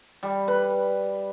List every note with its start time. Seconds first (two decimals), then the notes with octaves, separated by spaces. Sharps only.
0.23 G3
0.48 B4